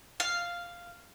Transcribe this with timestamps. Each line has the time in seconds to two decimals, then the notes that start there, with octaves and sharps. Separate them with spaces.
0.20 F5